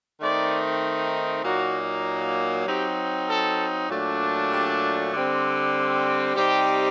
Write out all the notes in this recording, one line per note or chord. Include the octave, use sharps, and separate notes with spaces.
D#3 A3 C4 D#4 D5
A#2 F#3 A#3 D#4 F#4
F#3 C4 D#4 G4
A4
A#2 F#3 A3 D4
G4
D3 G3 C4
C3 G3 C4 D#4 G4